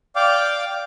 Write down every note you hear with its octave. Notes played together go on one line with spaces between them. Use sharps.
D5 F5 G5 D6